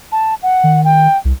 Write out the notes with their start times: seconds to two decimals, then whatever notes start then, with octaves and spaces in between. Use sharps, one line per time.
0.12 A5
0.43 F#5
0.64 D#3
0.85 G5
1.25 C2